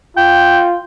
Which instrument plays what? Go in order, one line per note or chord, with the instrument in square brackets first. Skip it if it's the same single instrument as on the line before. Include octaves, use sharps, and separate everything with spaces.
[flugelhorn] F4 [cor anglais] G5